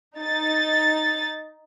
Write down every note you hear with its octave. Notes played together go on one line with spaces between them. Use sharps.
D#4 A6